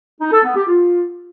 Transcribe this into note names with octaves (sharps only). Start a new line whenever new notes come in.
D#4
A4
B3
G4
F4